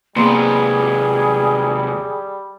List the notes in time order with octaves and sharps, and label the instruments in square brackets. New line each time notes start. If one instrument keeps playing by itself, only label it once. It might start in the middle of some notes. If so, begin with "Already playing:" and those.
[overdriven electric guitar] D#2 C3 [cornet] G3 [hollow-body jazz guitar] A#3 B3 C6 [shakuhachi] G#4